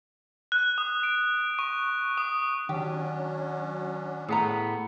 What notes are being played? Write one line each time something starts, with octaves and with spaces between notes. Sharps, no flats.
F#6
D#6
D7
C#6
D#6
D#3 F#3 C#4 D4 G4
A2 B3 G#4 A#5